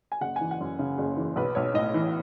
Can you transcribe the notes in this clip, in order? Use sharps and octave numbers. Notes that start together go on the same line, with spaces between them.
G#5
F#1 F#5
E3 G#5
F#5
F#2
C#3
F#1
E3
B1 B4
B1 C#5
A2 D#5
E3